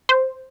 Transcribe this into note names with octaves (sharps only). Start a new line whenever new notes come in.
C5